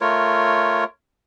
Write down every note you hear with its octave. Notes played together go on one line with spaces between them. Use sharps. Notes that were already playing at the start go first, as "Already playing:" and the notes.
A3 F4 A#4 C#5